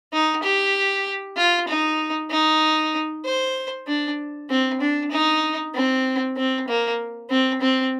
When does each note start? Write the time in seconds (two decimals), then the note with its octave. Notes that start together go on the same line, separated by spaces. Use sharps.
0.13 D#4
0.44 G4
1.37 F4
1.68 D#4
2.31 D#4
3.25 C5
3.87 D4
4.50 C4
4.81 D4
5.12 D#4
5.75 C4
6.37 C4
6.68 A#3
7.31 C4
7.62 C4